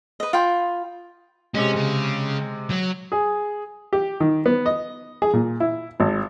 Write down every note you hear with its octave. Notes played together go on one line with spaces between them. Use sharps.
B4 D#5
F4 G5 B5
C3 G#3 C#4
C#3
F#3
G#4
G4
D#3
B3
D#5
G#4
A#2
E4
G#1